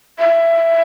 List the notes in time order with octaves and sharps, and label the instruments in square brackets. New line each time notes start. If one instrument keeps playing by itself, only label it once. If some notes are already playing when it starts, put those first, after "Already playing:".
[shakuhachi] E5